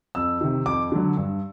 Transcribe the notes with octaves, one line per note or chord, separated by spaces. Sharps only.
F2 E6
C3 D#3
F2 D6
D3 F#3
G2